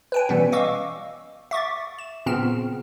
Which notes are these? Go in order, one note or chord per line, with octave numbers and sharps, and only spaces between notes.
B4 G5 G#5
B2 E3 G3 B3 C#4
D#5 F5 C#6 D6 E6
E5 C#6 D6 A6
E7
A#2 C#3 B3 C4 F6 E7